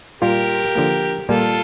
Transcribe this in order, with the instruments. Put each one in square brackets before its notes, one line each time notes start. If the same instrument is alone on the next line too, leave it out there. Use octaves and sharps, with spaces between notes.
[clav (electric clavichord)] A#2 G3 A#3 F4 [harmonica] G4 A#4
[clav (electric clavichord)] D3 F3 A#3
[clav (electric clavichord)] A#2 G3 A#3 [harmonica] F4 A4